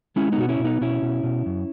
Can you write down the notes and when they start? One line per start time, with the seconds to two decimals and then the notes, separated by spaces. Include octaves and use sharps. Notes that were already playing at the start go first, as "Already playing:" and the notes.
0.16 G#3 C#4 E4
0.32 B3 D#4
0.38 B2 F#4
0.49 C#4 E4
0.59 B2
0.65 B3 D#4
0.81 B2 C#4 E4
1.02 B2
1.23 B2
1.46 F#2